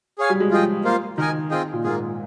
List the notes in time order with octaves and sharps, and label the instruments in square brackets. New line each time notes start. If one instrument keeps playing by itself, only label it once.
[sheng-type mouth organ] G#4 C#5 F5 G#5
[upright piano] G3
G#3
[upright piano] F3 [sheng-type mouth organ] F4 G#4 D#5 G5
[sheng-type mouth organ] A#3 F4 C5 F5
[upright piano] D#3 [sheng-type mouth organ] D#4 A#4 D#5 G#5
[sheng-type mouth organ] C4 F4 G#4 D#5 G5
[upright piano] A#2
[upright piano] G#2 [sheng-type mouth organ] A#3 F4 G#4